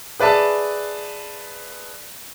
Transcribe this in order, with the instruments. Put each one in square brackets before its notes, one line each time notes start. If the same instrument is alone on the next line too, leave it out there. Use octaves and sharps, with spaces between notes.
[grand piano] G#4 B4 D5 E5 A5